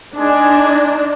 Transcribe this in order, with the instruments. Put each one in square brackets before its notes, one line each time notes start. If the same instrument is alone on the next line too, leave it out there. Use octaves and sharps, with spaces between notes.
[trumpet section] G#3 G#5 [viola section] D4 D#4